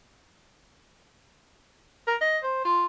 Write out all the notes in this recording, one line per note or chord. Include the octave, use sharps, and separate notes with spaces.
A#4
D#5
C5
F4